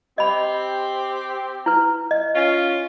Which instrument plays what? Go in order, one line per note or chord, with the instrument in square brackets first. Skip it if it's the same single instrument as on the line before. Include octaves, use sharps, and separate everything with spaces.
[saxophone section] C4 G4 [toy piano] D#5 B5
[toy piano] E4 B4
D#5
[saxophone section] C#4 F4